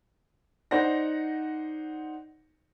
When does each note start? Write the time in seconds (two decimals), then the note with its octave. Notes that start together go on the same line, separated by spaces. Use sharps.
0.71 D#4 C5 D5 F#5 A#6